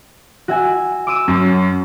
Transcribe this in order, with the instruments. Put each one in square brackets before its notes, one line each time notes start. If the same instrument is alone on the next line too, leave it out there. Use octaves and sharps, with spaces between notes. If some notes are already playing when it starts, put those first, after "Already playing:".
[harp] F#4 E5 G#5
D6 E6 D#7
[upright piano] F#2